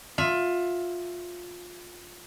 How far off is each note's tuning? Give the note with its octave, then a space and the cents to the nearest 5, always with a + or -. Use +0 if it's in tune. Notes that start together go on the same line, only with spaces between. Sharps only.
F4 +20 E5 +15